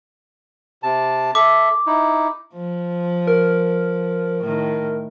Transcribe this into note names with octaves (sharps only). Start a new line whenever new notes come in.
C3 A5
A4 E5 D6
D#4 E4
F3
A#4
A2 D#3